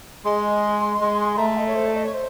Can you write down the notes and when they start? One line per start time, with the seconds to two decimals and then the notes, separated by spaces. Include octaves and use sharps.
0.24 G#3 C6
1.00 G#3
1.37 A3 A#5
1.46 A5
1.56 D#5
1.66 C#5
1.75 C5
1.85 D5
1.95 D#5
2.03 C#5
2.13 C5